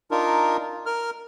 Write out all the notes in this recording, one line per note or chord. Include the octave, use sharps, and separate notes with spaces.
D4 D#4 F4 A#4
A#4 F6